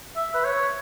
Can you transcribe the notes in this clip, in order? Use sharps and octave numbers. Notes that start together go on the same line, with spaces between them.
E5
B4
C#5